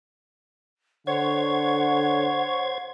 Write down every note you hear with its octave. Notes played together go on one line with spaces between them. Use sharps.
D3 C5 C#5 F#5 G#6